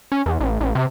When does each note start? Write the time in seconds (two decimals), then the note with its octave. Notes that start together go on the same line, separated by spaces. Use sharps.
0.12 C#4
0.26 E2
0.40 A1
0.60 A1
0.75 C3